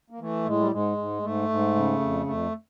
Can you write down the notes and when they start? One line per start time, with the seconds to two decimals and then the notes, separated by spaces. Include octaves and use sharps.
0.10 A#3
0.20 E3 A3
0.45 A2 G#3
0.59 G3
0.71 G#2 G#3
0.97 G#2
1.22 G#2 A3
1.49 G#2
1.75 C#3
2.00 F2
2.26 F2 A3